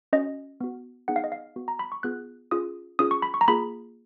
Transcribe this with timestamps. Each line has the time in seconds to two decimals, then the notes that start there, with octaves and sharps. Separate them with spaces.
0.13 C#4 F#4 D#5
0.61 B3 F#4
1.08 B3 D#4 G#4 F#5
1.16 F5
1.24 D#5
1.32 F5
1.56 B3 F#4
1.68 A#5
1.79 B5
1.92 C#6
2.03 B3 F4 G#4 F#6
2.51 C#4 F4 G#4 D#6
2.99 C#4 F4 G#4 D#6
3.11 C#6
3.22 B5
3.34 C#6
3.41 A#5
3.48 A#3 F4 G#4 B5